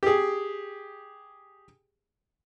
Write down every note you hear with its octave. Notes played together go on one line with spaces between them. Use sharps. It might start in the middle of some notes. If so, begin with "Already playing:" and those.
G4 G#4